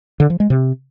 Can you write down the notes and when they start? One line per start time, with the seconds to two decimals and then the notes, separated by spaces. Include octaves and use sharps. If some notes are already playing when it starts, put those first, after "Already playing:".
0.20 D3
0.30 F3
0.40 G#3
0.50 C3